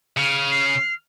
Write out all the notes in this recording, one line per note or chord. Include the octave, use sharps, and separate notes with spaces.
C#3 F6
C7